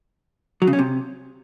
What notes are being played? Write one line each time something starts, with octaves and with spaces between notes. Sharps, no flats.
F#3
C#3
C#4
C3